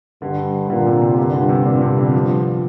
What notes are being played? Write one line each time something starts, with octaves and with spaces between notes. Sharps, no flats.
G2 D3
A#2 D3
C3
C3
G2 D3
D3
C3
G2 A#2
C3
D3
F3